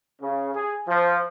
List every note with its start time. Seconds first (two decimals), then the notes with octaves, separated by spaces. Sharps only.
0.21 C#3
0.54 G#4
0.88 F3